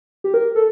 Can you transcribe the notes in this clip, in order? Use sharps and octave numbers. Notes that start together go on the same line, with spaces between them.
G4
A#4
A4